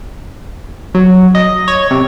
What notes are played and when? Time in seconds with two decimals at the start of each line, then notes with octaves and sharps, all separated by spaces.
0.95 F#3
1.35 D#5
1.68 C#5
1.91 C3